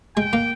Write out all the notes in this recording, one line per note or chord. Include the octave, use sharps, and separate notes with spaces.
G#3 G5
A#3